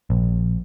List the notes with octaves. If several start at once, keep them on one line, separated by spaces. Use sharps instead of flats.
A#1